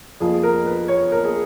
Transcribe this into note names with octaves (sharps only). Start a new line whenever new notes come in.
F2 F3 A#3 G#4
A#4
B4
C#5
A#4
G#4